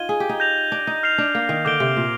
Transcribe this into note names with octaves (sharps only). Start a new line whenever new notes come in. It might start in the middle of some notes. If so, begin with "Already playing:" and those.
Already playing: D#4 F4 G#6 D#7 G7
G#4
G4
D#4
G6 A#6 F7
D4
D#4
F6 C7 F7
D4
A#3
D#3
D3 D6 G6 D7 G7
C3
A#2